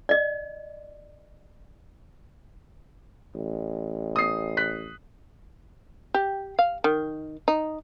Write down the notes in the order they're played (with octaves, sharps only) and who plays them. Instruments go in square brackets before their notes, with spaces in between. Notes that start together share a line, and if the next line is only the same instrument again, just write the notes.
[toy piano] D5 D#5
[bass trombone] A1
[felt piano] D#6 C7
F#6 B6
[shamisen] G4
F5
D#3
D#4